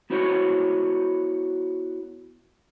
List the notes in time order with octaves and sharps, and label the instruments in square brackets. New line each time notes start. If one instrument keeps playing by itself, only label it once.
[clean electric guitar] B3 E4 F#4 C5 C#5